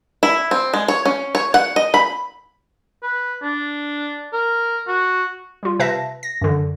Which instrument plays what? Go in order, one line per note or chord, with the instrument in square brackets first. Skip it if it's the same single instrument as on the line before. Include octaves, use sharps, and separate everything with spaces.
[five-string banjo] E4
C4
G#3
C#5
C#4
C#5
F#5
D#5
B5
[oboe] B4
D4
A#4
F#4
[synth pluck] G3 F4
C3 B4 E5 F5 A5 A#6
A#6
F#2 D3